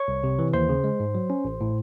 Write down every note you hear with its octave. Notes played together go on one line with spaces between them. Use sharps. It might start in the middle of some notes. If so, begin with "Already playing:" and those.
Already playing: C#5 C#6
C2
C3
E3
D#2 C5 C6
C#3
G#3
G#2
F#3
C#4
A1
A2